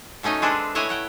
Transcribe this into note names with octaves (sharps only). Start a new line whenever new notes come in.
B2 A3 C#4 D#4 D#5
G#3 C4 D4 G#4 A4 B4
A3 E4 C#5 D#5 F#5 G#5
E4 F#5 G5